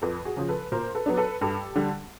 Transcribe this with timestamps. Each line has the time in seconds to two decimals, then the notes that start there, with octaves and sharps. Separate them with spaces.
0.02 F2 A4 B4
0.25 F#4 G#4
0.37 C#3 F3
0.48 A4 B4
0.71 A#2 A#4 C5
0.95 A4 B4
1.06 F#3 B3 D4
1.17 A4 B4
1.41 G2 G4 A4
1.75 D3 G3